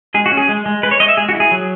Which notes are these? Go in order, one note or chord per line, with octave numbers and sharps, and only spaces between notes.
G#3 G#4
F#4
C#4
G#4
G#3
G#3
G#3 B4
C#5
G#3 D#5
E5
G#3 G#4
F#4
E4
G#4
F#3